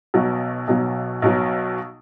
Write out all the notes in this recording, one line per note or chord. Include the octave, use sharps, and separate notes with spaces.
B1 B2 F#3
B1 B2 F#3
B1 B2 F#3